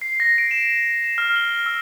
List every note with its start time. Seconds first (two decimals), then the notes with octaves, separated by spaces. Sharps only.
0.02 C7
0.20 A#6
0.38 D7
0.51 E7
1.04 E7
1.18 F6
1.36 G7
1.66 E6